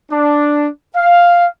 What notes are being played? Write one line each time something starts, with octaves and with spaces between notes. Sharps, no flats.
D4
F5